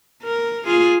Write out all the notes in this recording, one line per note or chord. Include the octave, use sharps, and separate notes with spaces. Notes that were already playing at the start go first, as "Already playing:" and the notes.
A#4
F4 G#4